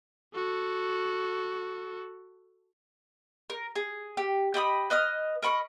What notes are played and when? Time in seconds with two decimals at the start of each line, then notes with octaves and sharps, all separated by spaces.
0.35 F#4 A4
3.50 A#4
3.76 G#4
4.17 G4
4.54 G4 D#5 B5 D#6
4.90 B4 D#5 D#6 F6
5.42 A#4 D#5 B5 C#6